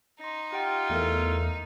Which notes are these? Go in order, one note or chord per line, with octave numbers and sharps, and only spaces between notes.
D#4 C6 A#6
F4 G4 F#5 G5
E2 A3 A4 A#4